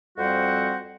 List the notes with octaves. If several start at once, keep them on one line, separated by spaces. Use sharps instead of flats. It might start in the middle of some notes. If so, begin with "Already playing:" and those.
F2 G3 C4 F#4 C5 F#5